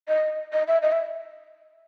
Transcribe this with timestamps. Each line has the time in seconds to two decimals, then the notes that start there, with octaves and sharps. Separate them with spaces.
0.08 D#5
0.53 D#5
0.68 E5
0.82 D#5
0.92 E5